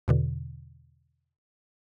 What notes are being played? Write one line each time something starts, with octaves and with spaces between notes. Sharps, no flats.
E2 B2 D3